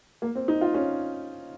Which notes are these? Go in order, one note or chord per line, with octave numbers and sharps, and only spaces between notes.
A#3
C4
D#4
F4
C#4